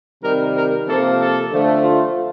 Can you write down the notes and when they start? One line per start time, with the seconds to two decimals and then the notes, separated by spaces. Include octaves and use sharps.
0.22 C3 D#3 G3 A#4
0.55 A#4
0.87 C3 F3 A#3 A4
1.19 A4
1.50 D3 F3 A3
1.83 F4